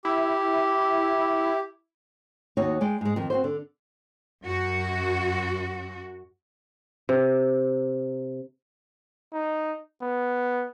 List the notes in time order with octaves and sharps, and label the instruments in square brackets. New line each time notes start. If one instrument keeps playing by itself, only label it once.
[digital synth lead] E4 [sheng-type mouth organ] G4
[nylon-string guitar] D#2 D#4 F#4 C#5
G#3 D5 G5
G#2 G#3
F2 D#3
C4 F#4 C5
D3
[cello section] F#2 F#4
[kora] C3
[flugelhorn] D#4
B3